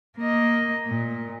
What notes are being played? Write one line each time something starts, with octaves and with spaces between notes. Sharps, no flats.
A#3 D#5
A#2